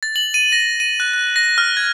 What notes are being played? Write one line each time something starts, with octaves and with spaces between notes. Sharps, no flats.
A6
F#7
D#7
A#6
D#7
F#6
F#6
A#6
F6
G#6